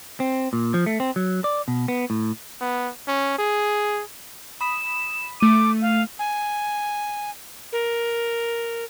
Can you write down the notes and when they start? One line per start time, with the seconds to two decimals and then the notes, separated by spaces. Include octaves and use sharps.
0.20 C4
0.53 A#2
0.74 F3
0.86 A3
1.00 C4
1.16 F#3
1.44 D5
1.68 B2
1.88 B3
2.10 A2
2.61 B3
3.07 C#4
3.39 G#4
4.61 B5 D#6 B6 E7
5.40 A3 D6 D#7
5.81 F5
6.19 G#5
7.72 A#4